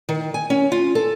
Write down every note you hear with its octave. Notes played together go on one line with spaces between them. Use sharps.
D#3
G#5
C#4
F4
A4